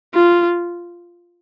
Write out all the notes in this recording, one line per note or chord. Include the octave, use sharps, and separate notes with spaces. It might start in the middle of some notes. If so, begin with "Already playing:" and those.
F4